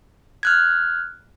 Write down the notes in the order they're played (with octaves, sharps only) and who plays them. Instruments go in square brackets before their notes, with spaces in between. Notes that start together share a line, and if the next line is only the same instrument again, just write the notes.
[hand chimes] F6 F#6 G#6